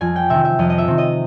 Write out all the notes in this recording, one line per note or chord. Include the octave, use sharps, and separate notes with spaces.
F2 G#5
G5
C3 D#3 E5
E5
F2 D#5
D#5
E5
C3 D#3
D#5